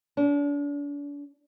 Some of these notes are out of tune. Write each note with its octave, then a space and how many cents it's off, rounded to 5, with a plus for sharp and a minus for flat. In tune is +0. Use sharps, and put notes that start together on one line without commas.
D4 -40